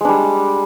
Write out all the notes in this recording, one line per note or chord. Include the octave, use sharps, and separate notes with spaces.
G3 G#3 D4